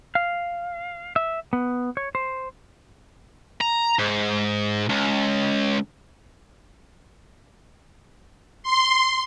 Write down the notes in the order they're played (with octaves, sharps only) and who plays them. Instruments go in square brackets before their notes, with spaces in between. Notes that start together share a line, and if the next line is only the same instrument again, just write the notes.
[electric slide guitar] F5
E5
B3
C#5
C5
[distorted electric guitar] A#5
G#2
C#2
[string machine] C6